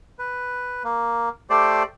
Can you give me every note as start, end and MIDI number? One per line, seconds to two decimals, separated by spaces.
0.19 0.83 71
0.84 1.29 58
1.50 1.83 57
1.50 1.83 67
1.50 1.83 72
1.50 1.83 74